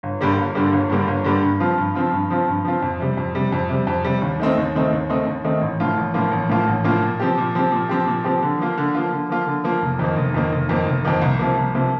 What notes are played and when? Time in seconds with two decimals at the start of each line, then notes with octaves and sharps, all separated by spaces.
0.03 G1
0.21 G2 D3 G3 A#3
0.37 G1
0.55 G2 D3 G3 A#3
0.73 G1
0.89 G2 D3 G3 A#3
1.07 G1
1.24 G2 D3 G3 A#3
1.43 G2
1.60 F3 C4 F4
1.78 G2
1.95 F3 C4 F4
2.13 G2
2.30 F3 C4 F4
2.48 G2
2.65 F3 C4 F4
2.82 F2
3.00 C3 G3
3.17 F2
3.35 C3 G3
3.52 F2
3.69 C3 G3
3.87 F2
4.04 C3 G3
4.22 D#2
4.40 D#3 A3 C4 D#4
4.57 D#2
4.75 D#3 A3 C4 D#4
4.92 D#2
5.10 D#3 A3 C4 D#4
5.27 D#2
5.44 D#3 A3 C4 D#4
5.62 A1
5.80 A2 F3 A#3 F4
5.97 A1
6.14 A2 F3 A#3 F4
6.32 A1
6.49 A2 F3 A#3 F4
6.67 A1
6.84 A2 F3 A#3 F4
7.02 A#2
7.20 F3 C4 G4
7.38 A#2
7.55 F3 C4 G4
7.72 A#2
7.89 F3 C4 G4
8.07 A#2
8.24 F3 C4 G4
8.43 D3
8.59 F3 A#3 F4
8.78 D3
8.95 F3 A#3 F4
9.12 D3
9.29 F3 A#3 F4
9.46 D3
9.64 F3 A#3 F4
9.82 F1
9.99 F2 D#3 A#3
10.16 F1
10.34 F2 D#3 A#3
10.52 F1
10.69 F2 D#3 A#3
10.86 F1
11.05 F2 D#3 A#3
11.22 C2
11.39 C3 F3 A#3
11.57 C2
11.75 C3 F3 A#3